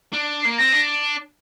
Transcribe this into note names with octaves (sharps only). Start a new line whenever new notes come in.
D4
A#3 C7
C4 A#6
D4